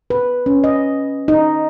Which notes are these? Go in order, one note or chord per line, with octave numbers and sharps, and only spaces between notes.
B4
C#4
D#5
D#4